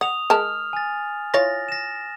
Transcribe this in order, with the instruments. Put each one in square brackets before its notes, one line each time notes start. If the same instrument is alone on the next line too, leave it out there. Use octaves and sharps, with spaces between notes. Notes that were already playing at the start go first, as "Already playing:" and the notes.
[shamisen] F#5 [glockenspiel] D#6 F7
[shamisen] G#3 A#4 A5 [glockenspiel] F6
[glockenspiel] G#5 A6
[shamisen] E4 F4 C#5 [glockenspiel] A6 A#6
[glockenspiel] A#6 E7